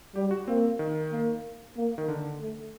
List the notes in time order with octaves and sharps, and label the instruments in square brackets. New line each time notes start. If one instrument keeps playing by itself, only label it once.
[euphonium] G3 [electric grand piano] G4
[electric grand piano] F#4
[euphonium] A#3 [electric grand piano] C4
[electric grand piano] D#3
[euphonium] A#3
A#3
[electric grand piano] D#3
D3
[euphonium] A3